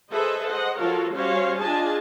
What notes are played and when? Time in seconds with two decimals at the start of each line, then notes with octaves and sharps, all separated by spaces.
0.12 G#4 A4 B4 C5 D#5 E5
0.45 C5 D#5 F#5
0.78 F3 F4 F#4 A4 A#4 C#5
1.13 G3 C#4 F#4 C5 C#5 F5
1.59 D4 F4 G#4 D#5 G#5 A5